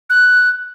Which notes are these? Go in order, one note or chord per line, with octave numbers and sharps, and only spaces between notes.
F#6